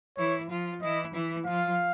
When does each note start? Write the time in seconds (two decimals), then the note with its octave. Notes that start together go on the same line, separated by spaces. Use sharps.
0.17 E3 E4 C#5
0.49 F3 F4
0.82 E3 E4 D#5
1.14 E3 E4
1.46 F3 F4 F5